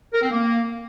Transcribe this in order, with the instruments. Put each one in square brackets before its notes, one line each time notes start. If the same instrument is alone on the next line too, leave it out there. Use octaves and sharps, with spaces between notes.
[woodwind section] A#4
C4
A#3